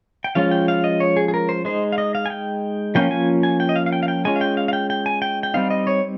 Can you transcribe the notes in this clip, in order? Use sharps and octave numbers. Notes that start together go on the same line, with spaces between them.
G5
F3 G#3 C#4 F4 F5
G5
F5
D#5
C#5
G#4
G#4
A#4
C5
G#3 D#4 C5
F5
D#5
F5
G#5
G5
F3 A#3 C#4 F4 G5
G#5
G#5
G5
D#5
F5
F5
G5
F5
G5
G#3 C#4 F4 G#5
F5
G5
F5
F5
G5
G5
G#5
G5
G5
G3 C4 D#4 F5
D#5
C#5